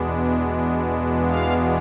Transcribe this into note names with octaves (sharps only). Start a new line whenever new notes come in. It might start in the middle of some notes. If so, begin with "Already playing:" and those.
Already playing: E2 B2 G#3 B3 D4
F5